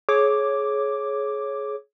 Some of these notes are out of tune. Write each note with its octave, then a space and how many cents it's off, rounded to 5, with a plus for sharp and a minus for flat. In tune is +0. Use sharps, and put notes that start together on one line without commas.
G#4 +25 C#5 -5 D6 +0